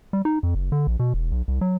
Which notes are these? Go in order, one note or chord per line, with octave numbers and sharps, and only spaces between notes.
G3
D#4
F2
F#1
D3
A#1
B2
E1
B1
C2
F#3